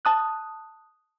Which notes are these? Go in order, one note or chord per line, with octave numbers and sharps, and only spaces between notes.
A5 D#6 F#6